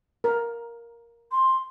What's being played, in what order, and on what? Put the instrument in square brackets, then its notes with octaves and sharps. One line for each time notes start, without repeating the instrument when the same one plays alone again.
[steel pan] A#4
[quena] C6